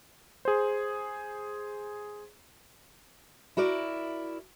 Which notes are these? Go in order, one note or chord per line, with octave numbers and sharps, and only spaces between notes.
G#4 C5
E4 F#4 A#4 D5